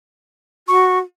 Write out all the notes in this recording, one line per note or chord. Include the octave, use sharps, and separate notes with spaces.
F#4 C#6